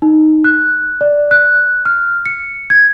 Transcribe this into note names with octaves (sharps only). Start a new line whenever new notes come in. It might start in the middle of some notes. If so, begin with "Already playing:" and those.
D#4
F#6
D5
F#6
F6
C#7
G#6